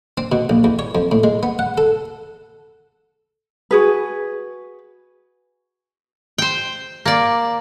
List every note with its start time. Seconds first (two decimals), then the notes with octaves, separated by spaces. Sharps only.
0.18 C4
0.32 B2
0.50 A#1
0.64 E2
0.79 C#5
0.95 F2
1.12 A2
1.24 G#3
1.43 B3
1.59 F#5
1.78 A4
3.71 F#4 G#4 B4
6.38 C5 G5
7.06 A#3 D5